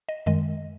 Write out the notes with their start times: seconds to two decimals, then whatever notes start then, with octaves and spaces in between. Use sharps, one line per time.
0.09 D#5
0.26 F#2 D#3 G#3 D#5